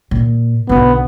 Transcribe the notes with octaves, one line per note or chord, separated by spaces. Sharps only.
A#2
B1 D3 B3